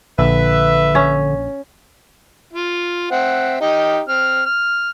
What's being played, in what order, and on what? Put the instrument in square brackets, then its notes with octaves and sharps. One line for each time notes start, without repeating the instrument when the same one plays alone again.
[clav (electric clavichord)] A#1 [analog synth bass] D3 [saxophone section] B4 E5
[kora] C#4
[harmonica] F4
C4 E5 F#5
D#4 G4 D#5
C4 F6
F6